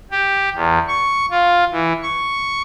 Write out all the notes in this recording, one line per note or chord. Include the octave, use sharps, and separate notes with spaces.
G4
E2
C#6
F4
E3
C#6